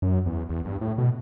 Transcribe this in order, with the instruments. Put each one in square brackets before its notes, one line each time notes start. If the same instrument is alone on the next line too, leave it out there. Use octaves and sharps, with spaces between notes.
[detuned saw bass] F#2
E2
E2
G2
A2
B2